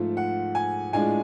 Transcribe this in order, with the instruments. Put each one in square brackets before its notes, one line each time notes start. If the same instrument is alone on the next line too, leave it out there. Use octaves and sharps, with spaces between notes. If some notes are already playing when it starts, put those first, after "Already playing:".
Already playing: [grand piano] G#2 F3 A3 F4
F#5
G#5
A2 G#3 D4 F4 G#5